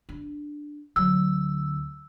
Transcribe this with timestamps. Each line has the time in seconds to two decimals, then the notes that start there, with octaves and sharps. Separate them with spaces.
0.09 D4
0.96 D2 F#3 E6